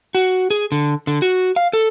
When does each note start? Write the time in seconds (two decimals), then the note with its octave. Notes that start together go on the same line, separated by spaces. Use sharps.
0.15 F#4
0.50 G#4
0.72 D3
1.07 D3
1.22 F#4
1.56 F5
1.73 A4